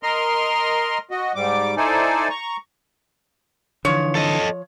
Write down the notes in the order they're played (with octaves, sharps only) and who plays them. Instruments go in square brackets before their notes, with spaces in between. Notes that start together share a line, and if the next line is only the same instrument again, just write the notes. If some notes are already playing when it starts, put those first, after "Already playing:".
[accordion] A#4 D#5 C6 F6
F#4 D#5
G#2 G3 D6
D#4 E4 A4 C5 D5 G#5
A#5 C#6
[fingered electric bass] D3 E3 [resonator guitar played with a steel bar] F3 C#5
[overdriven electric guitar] A4 D#5